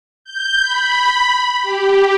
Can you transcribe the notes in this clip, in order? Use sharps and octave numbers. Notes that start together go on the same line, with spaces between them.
G6
B5
G4